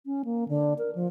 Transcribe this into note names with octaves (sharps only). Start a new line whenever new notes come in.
C#4
A#3
D3
A#4
F3